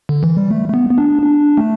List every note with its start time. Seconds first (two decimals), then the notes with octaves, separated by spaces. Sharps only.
0.09 D3
0.23 E3
0.37 G3
0.51 A3
0.69 A3
0.74 B3
0.90 B3
0.98 D4
1.22 D4
1.57 A3